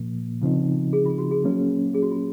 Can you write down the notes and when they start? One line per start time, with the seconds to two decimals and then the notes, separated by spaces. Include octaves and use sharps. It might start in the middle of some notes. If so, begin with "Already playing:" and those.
Already playing: A#2 F3 A#3
0.42 C#3 F3 C4 D#4
0.93 G#4
1.05 F4
1.18 F#4
1.31 G#4
1.44 F#3 A#3 C#4
1.94 G#4
2.02 F#4
2.11 F4